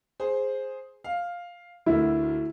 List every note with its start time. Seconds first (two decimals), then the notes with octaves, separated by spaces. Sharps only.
0.20 G#4 C5
1.04 F5
1.86 D2 D3 E4 A#4